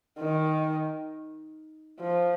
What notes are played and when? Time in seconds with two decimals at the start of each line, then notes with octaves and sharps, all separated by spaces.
0.19 D#3
2.00 F3